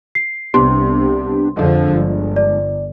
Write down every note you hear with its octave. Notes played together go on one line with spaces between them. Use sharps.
C7
C2 C3 B3 D4 G4 C6
F2 D3 F3 G#3 D4
G1
D5